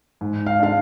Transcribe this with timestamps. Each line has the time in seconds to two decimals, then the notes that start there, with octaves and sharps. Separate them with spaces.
0.21 G#2
0.46 F5
0.59 G#3 D4 F5